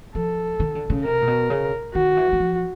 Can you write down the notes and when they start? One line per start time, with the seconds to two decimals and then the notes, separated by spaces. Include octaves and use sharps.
0.15 F3 A4
0.60 D#3
0.75 D3
0.90 C#3
1.05 C3 A#4
1.22 A#2
1.27 B2
1.50 C#3
1.94 D#3 F#4
2.17 E3
2.32 F#3
2.40 F3